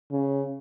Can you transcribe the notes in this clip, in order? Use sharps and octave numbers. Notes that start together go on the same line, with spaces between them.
C#3